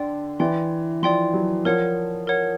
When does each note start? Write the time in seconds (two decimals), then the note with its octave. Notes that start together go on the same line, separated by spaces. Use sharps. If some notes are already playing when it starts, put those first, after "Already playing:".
Already playing: D3 D5 G5 C6
0.39 E3 D5 G5 C6
1.02 F3 D5 G5 C6
1.34 F#3
1.65 F3 A#4 C#5 F#5
2.27 A#4 C#5 F#5